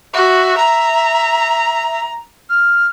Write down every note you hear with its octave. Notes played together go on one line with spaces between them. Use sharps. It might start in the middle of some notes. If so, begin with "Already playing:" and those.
F#4 E5
A#5
F6